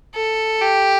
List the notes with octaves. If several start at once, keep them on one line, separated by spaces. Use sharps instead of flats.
A4
G4